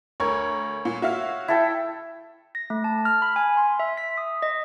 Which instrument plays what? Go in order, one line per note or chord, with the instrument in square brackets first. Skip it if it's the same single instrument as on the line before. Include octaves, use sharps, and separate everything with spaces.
[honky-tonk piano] D2 A#4 G#6 [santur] C#5
[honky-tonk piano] A#2
F#4 E5 F5
[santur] E4 A4 G5
[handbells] A#6
A3
A5
F6
B5
G#5
C6
E5
B6
D#6
D#5